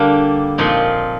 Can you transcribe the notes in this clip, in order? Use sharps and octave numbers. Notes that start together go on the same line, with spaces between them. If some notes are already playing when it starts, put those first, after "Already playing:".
Already playing: D3 G3 A#3 D4
A#2 F3 C4 D#4